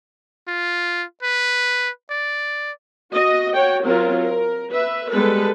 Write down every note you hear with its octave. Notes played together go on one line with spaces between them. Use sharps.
F4
B4
D5
F#4 D#5
F#4 C#5 G5
F#3 C4 F4 A#4
A#4
B4 E5
G3 G#3 B3 A4 B4